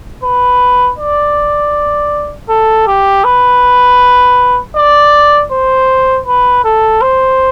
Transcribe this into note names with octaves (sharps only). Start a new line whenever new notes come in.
B4
D5
A4
G4
B4
D5
C5
B4
A4
C5